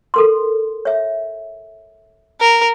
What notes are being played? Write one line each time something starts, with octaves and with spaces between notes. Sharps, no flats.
A4 A#4 C6
C#5 E5
A#4